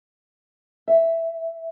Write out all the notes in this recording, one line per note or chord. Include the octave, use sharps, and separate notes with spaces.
E5